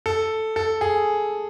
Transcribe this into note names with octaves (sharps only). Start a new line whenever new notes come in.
A4
A4
G#4